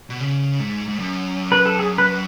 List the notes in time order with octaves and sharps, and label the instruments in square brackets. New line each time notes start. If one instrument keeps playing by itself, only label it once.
[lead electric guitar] B2
C#3
G#2
G#2
F#2
[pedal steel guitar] B4
A4
G#4
B4